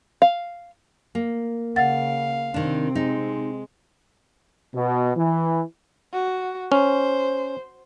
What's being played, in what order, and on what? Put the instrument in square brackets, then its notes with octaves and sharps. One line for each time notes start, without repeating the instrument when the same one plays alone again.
[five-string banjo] F5
[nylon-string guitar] A#3
[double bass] C#3 [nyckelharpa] F5 [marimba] F#5 A6
[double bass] C3 C4 [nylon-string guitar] D#3 D4
[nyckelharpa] G#3 [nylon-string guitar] D#4
[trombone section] B2
E3
[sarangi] F#4
[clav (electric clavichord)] C#4 [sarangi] C5